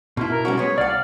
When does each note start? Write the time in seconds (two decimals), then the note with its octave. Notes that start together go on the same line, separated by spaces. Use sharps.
0.17 B2 E4 F4
0.31 A#4
0.45 G3 C#4 F#4
0.57 G#3 B3 C#5
0.78 C2 D5 F5 F#5